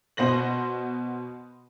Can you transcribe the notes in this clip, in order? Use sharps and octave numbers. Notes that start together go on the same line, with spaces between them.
B2 B3 C5 A#6 F#7